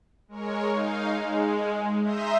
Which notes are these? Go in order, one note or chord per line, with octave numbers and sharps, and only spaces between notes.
G#3 A#4 C#5
D#4 F5
G#3
E5 A#5 C6 D#6 G6 A#6